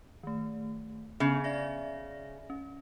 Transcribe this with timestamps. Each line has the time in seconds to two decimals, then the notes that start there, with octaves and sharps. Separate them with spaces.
0.23 D#3 A3
1.20 C#3 B3
1.44 D5 E5 A#6
2.50 C#4